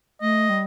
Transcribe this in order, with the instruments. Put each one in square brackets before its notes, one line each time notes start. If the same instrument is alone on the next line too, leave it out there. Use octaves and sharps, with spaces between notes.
[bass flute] A3 [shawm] D#5
[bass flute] G3